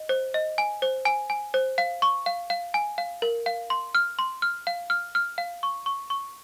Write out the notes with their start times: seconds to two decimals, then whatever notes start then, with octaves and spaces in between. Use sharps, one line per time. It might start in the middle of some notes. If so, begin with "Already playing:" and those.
Already playing: D#5
0.09 C5
0.34 D#5
0.58 G#5
0.82 C5
1.05 G#5
1.30 G#5
1.54 C5
1.78 F5
2.02 C#6
2.26 F5
2.50 F5
2.74 G#5
2.98 F5
3.22 A#4
3.46 F5
3.70 C6
3.95 F6
4.19 C6
4.42 F6
4.67 F5
4.90 F6
5.15 F6
5.38 F5
5.63 C#6
5.86 C#6
6.10 C#6